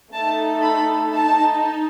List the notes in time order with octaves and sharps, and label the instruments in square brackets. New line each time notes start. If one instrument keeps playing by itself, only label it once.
[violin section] A3 D#4 A4 A5
B5
D#4 A5